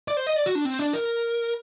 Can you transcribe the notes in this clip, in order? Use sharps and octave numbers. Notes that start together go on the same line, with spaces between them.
D5
C5
D#5
D5
F#4
D4
C4
D4
A#4